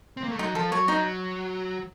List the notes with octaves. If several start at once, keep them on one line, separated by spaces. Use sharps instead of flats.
C4
A#3
A3
F#3 D#4
F3 A4
F#3 C#5
F#3 D#4